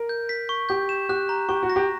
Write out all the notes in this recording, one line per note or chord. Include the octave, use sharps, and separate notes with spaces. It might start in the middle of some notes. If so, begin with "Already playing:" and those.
Already playing: A#4
G6
B6
C#6
G4 G6
E7
G4 F#6
A#5
G4 C#6
F#4
A#6
G4